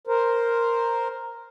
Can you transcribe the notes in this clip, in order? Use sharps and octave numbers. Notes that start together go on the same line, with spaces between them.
A#4 C5